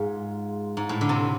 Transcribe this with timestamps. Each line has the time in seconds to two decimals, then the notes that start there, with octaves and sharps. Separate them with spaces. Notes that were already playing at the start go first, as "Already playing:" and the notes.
Already playing: G#2 G#3 F4
0.77 G#2
0.89 A2
1.01 D3
1.09 C3